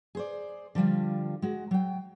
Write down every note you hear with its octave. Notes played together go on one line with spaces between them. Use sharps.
G#4 C5 D5
D3 F3 G3 F4
G#3 F#4
F#3 G5